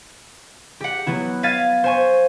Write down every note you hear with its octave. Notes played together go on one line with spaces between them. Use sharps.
G4 F#5
F#3 B3 E4
F5 G#6 A6 B6 D#7
C5 G#5 C#6